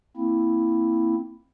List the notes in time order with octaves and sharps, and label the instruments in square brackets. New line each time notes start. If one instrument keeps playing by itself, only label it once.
[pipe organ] A#3 C4 E4